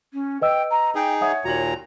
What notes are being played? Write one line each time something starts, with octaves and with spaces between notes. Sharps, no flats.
C#4
B4 D#5 G5 E6
A#5
D#4 G#4 G5
C#5 E5 F#5 D#6
D#2 A#2 F#4 A#5 F#7